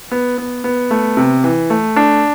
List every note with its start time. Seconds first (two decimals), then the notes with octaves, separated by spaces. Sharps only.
0.11 B3
0.38 B3
0.64 B3
0.91 A3
1.17 C3
1.44 E3
1.70 A3
1.96 D4